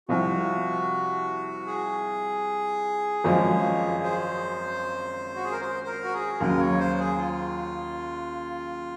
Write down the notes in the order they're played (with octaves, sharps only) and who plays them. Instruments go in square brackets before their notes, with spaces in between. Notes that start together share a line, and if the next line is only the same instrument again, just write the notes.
[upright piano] C2 C3 F3 [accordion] F#4
[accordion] G#4
[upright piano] G#1 F#2 F3 G#3
[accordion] C5
F#4
G#4
A#4
C5
C5
A#4
F#4
G#4
[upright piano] D#2 C#3 F#3 [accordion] A#4
[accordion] C#5
C5
G#4
F4